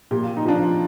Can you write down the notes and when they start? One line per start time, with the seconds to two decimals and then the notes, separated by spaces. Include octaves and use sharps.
0.11 A#2 G4
0.23 F4
0.37 D#4
0.46 F3 D4 F4